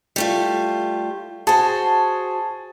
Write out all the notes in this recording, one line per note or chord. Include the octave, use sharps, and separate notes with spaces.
G3 A3 F4
F#4 G#4 C5 A5